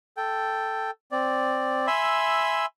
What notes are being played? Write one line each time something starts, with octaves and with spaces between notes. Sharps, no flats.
A4 G5
C4 D5
E5 G#5 B5 C6 E6